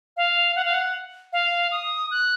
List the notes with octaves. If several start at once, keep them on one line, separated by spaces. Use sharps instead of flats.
F5
F#5
F5
F#5
F5
D#6
F#6